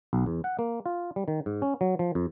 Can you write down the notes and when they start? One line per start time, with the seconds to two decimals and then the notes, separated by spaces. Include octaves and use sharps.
0.13 B1
0.26 E2
0.44 F#5
0.59 A#3
0.86 F4
1.16 G3
1.28 D#3
1.46 G#2
1.62 C#4
1.81 F#3
1.99 F3
2.15 F2